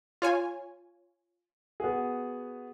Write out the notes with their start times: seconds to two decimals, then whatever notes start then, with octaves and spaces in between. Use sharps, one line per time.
0.22 F4 C#5 G#5
1.80 B3 F#4 G#4